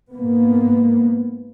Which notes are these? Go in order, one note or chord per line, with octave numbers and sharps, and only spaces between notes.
G#2 A#3 B3